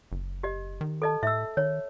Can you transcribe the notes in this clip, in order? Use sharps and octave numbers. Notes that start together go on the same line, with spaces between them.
F#1
G4 D#5
D#3
A4 D#5 A5
A2 E5 E6
D#3 C#5